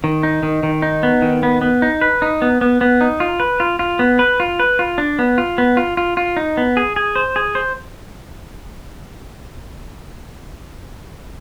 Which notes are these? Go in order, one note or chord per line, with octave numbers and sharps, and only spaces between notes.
D#3
D#4
D#3
D#3
D#4
B3
D#3
B3
B3
D#4
B4
D#4
B3
B3
B3
D#4
F4
B4
F4
F4
B3
B4
F4
B4
F4
D4
B3
F4
B3
F4
F4
F4
D#4
B3
G#4
G#4
C5
G#4
C5